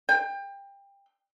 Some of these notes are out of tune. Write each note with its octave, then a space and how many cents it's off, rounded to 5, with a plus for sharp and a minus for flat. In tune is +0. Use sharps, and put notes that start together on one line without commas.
G5 +25